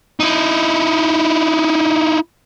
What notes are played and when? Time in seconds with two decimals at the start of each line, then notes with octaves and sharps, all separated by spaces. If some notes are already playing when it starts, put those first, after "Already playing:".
0.20 D#4 E4